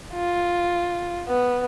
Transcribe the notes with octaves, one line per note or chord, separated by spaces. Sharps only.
F4
B3